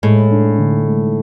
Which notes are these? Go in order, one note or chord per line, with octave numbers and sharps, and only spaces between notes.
A2 G#3
D4
D3
G#3